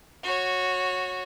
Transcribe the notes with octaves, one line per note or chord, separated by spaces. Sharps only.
F#4 C#5